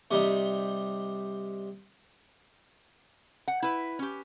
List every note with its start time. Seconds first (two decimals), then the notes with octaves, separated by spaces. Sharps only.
0.11 C3 G3 D#4
3.48 F#5
3.62 E4 B4
3.99 C#4 G4